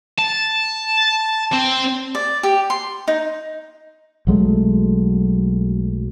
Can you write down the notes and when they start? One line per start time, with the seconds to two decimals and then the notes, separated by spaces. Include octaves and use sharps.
0.19 A5
1.53 C4
2.15 D5
2.43 G4
2.70 C6
3.08 D#4
4.27 B1 F#3 G#3 A3